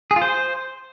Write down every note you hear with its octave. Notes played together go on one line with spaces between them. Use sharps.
G#4
F4
C5